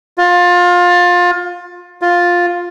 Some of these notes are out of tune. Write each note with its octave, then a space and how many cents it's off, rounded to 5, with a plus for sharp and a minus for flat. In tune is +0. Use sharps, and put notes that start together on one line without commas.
F4 +25
F4 +10